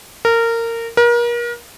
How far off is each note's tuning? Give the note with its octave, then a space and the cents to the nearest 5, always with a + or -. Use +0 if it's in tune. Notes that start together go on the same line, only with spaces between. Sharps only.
A#4 -20
A#4 +35